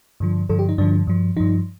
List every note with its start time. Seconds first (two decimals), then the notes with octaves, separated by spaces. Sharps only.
0.20 G2 D3 F3
0.49 G2 D3 F3 A4
0.59 G4
0.69 D#4
0.78 G2 D3 F3 D4
1.07 G2 F3
1.37 G2 F3 D#4